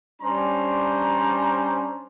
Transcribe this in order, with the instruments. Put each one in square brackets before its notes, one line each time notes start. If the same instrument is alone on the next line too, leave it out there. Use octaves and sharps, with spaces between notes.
[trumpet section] G3 C#4 D4 C5 A#5 C6